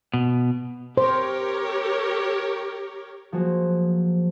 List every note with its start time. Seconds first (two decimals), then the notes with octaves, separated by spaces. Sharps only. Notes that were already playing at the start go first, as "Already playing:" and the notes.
0.14 B2
0.97 G4 A#4 C5 C#5
3.32 F3 F#3 A#3 F#4 G#4 C5